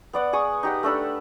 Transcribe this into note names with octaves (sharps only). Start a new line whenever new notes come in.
B3 D5 F#5
G#4 C#6 D#6
D#4 G4 F#5
A3 D4 A4 B5